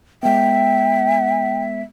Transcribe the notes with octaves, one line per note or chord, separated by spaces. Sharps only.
G#3 B3 E5 G5